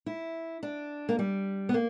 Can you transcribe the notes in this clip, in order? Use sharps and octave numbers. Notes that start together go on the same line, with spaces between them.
E4
D4
A#3
G3
B3
A#3